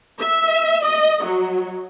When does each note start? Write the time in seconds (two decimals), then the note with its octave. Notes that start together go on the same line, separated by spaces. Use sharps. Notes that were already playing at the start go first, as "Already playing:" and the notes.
0.19 E5
0.83 D#5
1.25 F#3